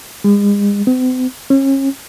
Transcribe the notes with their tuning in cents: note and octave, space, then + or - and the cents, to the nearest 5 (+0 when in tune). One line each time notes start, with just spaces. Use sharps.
G#3 -40
C4 -45
C#4 -35